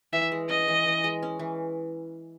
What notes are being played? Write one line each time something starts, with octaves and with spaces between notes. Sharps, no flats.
E3 E5
G#3
C#4 D#5
E3
E3
G#3
C#4
E3